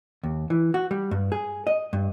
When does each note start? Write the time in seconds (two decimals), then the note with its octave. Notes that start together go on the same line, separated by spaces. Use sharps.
0.23 D#2
0.50 E3
0.74 F#4
0.91 G3
1.11 G2
1.32 G#4
1.67 D#5
1.93 G2